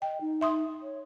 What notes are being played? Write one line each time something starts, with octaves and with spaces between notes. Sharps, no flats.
D#5 G5
D#4
E5 C6 D#6
C#5